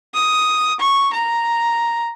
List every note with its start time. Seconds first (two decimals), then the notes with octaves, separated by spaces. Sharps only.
0.14 D#6
0.79 C#6
1.13 A#5